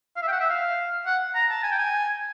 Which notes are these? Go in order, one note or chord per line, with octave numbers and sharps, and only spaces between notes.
F5
E5
G5
F#5
E5
F5
F#5
A#5
A5
G#5
G5
G#5